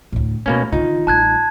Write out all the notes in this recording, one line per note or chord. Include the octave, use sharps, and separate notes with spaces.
D2 A2
B2 A3 A#3 C#4
D3 D#3 D#4 F4
A1 G3 A5 F#6 G#6